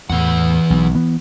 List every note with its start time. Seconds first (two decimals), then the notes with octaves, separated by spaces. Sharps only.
0.10 E2 A2 E3 F#5
0.70 B1
0.95 E3 B3